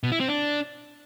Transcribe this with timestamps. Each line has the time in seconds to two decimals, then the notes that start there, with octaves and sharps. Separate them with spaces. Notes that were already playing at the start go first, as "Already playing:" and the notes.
0.03 B2
0.12 E4
0.20 C4
0.28 D4